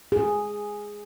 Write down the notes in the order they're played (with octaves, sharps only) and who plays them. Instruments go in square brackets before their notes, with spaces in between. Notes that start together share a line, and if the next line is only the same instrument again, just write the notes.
[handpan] G#4